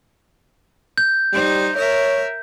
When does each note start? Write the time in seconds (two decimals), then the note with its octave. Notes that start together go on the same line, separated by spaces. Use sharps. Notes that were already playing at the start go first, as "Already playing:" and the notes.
0.98 G6
1.33 G3 D#4 C5
1.76 A#4 C#5 E5